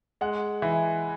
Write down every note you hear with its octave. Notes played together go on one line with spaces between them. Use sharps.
G#3 F#5
E3